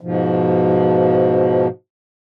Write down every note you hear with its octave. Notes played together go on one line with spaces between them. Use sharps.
G#2 B2 F3